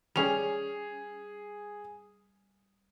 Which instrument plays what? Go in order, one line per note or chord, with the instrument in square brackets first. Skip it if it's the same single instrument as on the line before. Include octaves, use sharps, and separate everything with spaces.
[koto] G3 C#4 [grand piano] G#4 F7